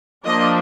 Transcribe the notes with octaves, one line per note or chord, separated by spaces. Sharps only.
F3 A#3 D4 D#5